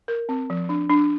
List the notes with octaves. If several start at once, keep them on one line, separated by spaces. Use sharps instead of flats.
A#4
C4
F3
D4
D4